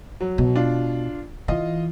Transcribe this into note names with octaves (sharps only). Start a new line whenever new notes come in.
F#3
B2
D4 F4
E3 F4 D#5